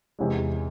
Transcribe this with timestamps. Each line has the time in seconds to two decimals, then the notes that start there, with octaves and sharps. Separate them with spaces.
0.19 E2 C3 E3 G#3